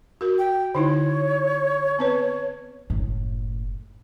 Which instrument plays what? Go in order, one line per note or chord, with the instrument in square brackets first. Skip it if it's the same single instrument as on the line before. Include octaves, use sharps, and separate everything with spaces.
[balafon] F#4 A#4
[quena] G5
[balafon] D3 D#4 E4 [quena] C#5
[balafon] B3 C4 B4
[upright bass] F#1 A2